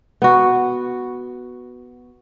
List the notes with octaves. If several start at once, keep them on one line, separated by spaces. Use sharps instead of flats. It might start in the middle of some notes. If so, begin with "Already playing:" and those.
B3 F#4